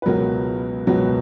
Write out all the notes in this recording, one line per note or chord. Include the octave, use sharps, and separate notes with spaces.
B4
C#2 B2 F#3 B3 A#4
C#2 B2 F#3 B3